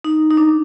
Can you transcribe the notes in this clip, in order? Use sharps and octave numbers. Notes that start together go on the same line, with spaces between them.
D#4
D#4
D4